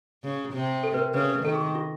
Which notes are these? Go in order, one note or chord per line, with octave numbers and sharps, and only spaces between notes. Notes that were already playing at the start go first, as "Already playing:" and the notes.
C#3
C3
A4
B4
A#4
C#3 B4
B4
D#3 A4
G#4
F4